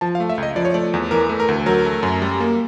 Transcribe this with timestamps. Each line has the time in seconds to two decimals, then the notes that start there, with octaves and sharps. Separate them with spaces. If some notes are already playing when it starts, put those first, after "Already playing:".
0.01 F3 A5
0.15 F5
0.20 A3
0.29 E5
0.38 C#2
0.43 D#5
0.56 F3 D5
0.65 C#5
0.74 A3 D5
0.94 E2
1.11 E3 A#4
1.29 A3
1.40 A#4
1.48 D2
1.66 F#3 A#4
1.85 A3
2.03 F#2
2.22 G3
2.41 A#3